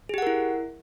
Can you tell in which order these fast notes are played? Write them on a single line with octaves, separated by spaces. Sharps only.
G#4 G4 F#5 A#4 E4